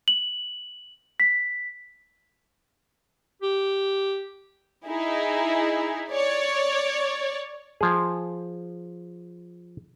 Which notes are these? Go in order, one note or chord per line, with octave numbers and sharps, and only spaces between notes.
F#7
B6
G4
D#4 E4 G#4
C#5 D5
F3 G#4